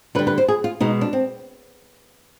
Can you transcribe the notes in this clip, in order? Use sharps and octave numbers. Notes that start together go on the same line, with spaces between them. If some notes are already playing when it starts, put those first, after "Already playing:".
D3 G3 B4
B4
C5
G#4
F4
B2 G#3 D#4
D4
C4